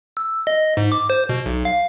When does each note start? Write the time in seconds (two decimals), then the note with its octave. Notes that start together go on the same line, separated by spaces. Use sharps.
0.17 E6
0.47 D#5
0.77 G#2
0.92 D6
1.10 C5
1.29 B2
1.46 B1
1.65 F5